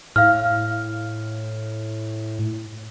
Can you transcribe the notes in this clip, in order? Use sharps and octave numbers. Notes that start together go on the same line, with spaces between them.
A2 F5 F6